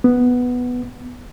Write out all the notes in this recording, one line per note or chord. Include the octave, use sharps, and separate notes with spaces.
B3